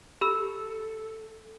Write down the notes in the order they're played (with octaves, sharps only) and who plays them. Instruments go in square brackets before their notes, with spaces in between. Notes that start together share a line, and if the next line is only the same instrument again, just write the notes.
[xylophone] G4 B5 E6 [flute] A4